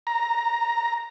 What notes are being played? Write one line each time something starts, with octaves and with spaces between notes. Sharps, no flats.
A#5